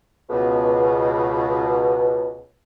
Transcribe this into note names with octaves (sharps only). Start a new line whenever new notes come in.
C#2 B2